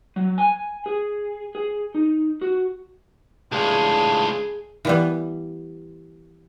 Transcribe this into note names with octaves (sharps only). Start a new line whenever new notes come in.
F#3
G#5
G#4
G#4
D#4
F#4
C#2 A2 D4 F4 G#4
E3 G3 B3